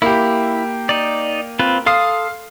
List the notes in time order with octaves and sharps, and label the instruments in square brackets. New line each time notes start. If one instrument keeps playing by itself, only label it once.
[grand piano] A#3 G4 [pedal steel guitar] E4
[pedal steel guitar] D#4 D5
C4 F4 B4
[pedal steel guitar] A4 C6 D#6 [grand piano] F5